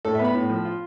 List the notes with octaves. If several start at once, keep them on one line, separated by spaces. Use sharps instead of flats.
A2 A4
B3 E5
B5
A2
F3
F4